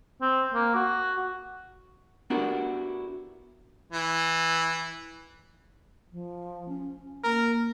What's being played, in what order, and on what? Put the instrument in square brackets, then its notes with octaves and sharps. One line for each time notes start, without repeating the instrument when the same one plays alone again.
[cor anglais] C4
A#3
F#4
[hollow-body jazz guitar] B3 D4 E4 F#4 G4 A#4
[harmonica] E3
[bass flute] F3
C#4
[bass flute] A#3 [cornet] A#4